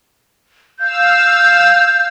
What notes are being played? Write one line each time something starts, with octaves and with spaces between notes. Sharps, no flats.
F5 E6 G6